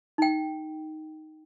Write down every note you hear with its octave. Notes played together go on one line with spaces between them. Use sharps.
D#4 G5